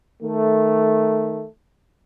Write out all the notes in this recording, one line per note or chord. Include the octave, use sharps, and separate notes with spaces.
D#3 A3